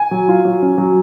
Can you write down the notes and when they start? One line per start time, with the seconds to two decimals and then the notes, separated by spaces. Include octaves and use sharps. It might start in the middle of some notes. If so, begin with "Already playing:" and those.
Already playing: G#5
0.11 F#3
0.28 F4
0.45 F#3
0.62 C#4
0.78 F#3